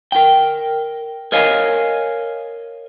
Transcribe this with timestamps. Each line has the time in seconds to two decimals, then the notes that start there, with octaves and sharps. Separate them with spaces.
0.12 A#4 G5
1.32 A#4 C#5 D#5 F5 G#5